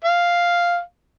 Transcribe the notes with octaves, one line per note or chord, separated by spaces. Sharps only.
F5